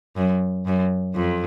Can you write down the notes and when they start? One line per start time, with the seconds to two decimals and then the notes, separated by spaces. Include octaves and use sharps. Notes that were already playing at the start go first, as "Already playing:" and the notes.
0.17 F#2
0.66 F#2
1.16 F2